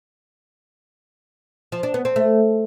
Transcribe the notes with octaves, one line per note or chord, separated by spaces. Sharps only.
F3
D4
B3
C4
A3